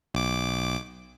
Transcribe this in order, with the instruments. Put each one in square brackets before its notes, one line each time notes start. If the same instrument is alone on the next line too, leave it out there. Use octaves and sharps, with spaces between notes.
[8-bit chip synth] B1 D6